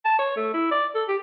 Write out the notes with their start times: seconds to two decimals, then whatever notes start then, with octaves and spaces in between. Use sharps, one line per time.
0.05 A5
0.19 C#5
0.37 A3
0.54 E4
0.71 D5
0.95 A4
1.08 G4